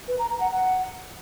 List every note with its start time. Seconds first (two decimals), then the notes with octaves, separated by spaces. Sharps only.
0.08 B4
0.19 A#5
0.30 A#5
0.40 F#5
0.51 F#5